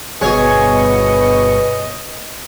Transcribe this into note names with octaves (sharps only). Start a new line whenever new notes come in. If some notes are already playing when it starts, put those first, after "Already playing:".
G1 B2 G#4 B4 C#5 D#5 C#6